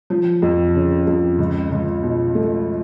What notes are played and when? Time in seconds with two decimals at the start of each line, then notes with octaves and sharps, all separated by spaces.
0.10 F3
0.42 F2
0.75 C#3
1.07 F2
1.39 C#2
1.72 C#2
2.03 B2
2.35 A3